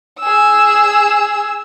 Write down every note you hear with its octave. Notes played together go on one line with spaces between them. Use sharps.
G#4 E6